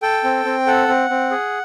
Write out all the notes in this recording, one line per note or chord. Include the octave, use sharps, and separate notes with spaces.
A4 G5
C4
C4
A4 F#5
C4
C4
G#4